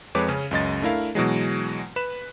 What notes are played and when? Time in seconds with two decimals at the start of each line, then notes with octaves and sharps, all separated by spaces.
0.15 F2 G#3 B4 C#5 D6
0.28 C#3 C#4
0.51 C#2 F#2 D#5 A6
0.82 A3 D4 E4 A#4 F5
1.15 B2 E3 F#3 G#3
1.96 B4 B5 E7